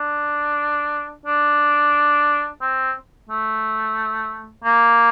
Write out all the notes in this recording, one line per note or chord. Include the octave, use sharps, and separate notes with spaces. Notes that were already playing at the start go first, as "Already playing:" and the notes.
Already playing: D4
D4
C4
A3
A#3